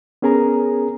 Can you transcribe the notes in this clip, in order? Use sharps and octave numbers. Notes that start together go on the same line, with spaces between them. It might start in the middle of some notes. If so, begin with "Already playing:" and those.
B3 C#4 G#4 A#4 A#5